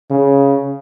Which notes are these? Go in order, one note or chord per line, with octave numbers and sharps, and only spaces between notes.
C#3